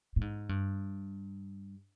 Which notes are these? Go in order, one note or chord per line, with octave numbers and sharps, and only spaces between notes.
A2
G#2
G2